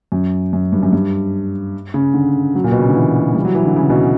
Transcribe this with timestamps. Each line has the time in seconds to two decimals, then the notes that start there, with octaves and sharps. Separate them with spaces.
0.12 F#2
0.53 F#2
0.72 G2
0.83 F#2
0.93 G2
1.94 C#3
2.14 D3
2.55 F#3
2.64 A#2
2.72 B2
2.79 C#3
2.88 D3
2.95 E3
3.34 G3
3.45 F#3
3.55 E3
3.65 D3
3.76 C#3
3.90 B2